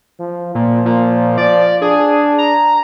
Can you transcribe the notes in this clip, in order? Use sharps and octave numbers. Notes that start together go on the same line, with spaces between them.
F3
A#2 F3
A#2
D5
D4 G#4
A#5